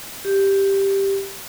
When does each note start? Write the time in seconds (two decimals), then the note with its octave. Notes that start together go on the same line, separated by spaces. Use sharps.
0.25 G4